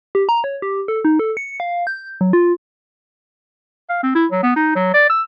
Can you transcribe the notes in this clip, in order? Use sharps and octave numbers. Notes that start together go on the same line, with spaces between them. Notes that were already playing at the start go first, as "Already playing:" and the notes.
G4
A#5
C#5
G4
A4
D#4
A4
C#7
F5
G6
F#3
F4
F5
C4
E4
F#3
B3
D#4
F#3
D5
E6